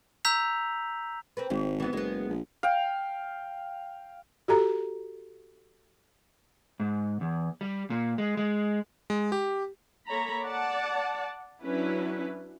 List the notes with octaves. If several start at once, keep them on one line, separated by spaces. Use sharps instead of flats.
A#5 E6 G6 B6 F7
C4 A#4 B4
G#1 G#2
E3 B3
F#1 G#3 B3
A#1
F5 G5
F#4 G4 A4 A#5
G#2
E2
G3
A#2
G#3
G#3
G#3
G4
A#3 A4 C#5 A#5 B5
D5 F#5 A5
F#3 C#4 D4 E4 B4